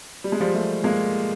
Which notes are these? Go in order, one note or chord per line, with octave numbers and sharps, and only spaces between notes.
G3
G#3
F3 G3
G3 A3
G#3 A#3